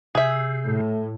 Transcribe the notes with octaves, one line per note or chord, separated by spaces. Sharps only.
C3 G#4 E5
A2 A3